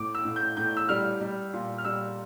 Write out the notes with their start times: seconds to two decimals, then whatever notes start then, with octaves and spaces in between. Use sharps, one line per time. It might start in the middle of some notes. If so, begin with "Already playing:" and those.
Already playing: A2 D6
0.15 E6
0.25 A2
0.36 G6
0.57 A2 G6
0.77 E6
0.89 G3 F6
1.21 G3
1.53 A#2
1.78 F6
1.85 G3 E6